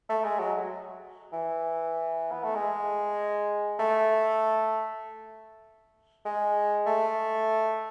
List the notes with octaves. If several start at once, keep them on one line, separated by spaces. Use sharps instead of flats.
A3
G#3
F#3
E3
B3
A3
G#3
A3
G#3
A3